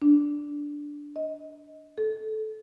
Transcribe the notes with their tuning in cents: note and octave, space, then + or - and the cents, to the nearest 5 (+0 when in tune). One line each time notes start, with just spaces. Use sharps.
D4 -5
D#5 +15
A4 -15